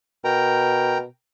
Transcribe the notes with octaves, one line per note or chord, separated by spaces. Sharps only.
B2 A#4 G5 A#5